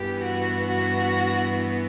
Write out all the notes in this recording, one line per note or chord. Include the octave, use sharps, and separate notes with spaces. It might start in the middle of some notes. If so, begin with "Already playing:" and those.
Already playing: G2 E3 B3 G4
F#4
F#4